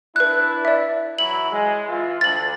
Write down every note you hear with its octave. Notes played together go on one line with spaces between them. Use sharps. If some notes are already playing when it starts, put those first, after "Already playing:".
D4 E4 B4 F#6
D5 E5
E3 F#3 E4 F#7
G#3
E3 F4
D2 A6 F#7